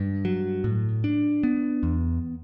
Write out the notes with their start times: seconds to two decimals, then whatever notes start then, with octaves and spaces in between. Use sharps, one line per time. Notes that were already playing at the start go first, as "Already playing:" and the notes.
Already playing: G2
0.25 F#3
0.64 A2
1.04 D4
1.43 B3
1.83 E2